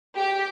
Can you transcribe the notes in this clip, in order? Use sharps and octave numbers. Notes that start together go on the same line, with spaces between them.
G4